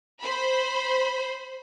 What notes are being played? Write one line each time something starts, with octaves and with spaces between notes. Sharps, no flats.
C5 B5